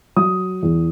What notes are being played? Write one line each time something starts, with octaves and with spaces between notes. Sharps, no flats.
F#3 D#6
E2